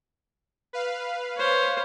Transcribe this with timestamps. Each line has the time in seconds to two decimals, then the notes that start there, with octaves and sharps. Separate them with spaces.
0.73 B4 F5
1.37 C5 C#5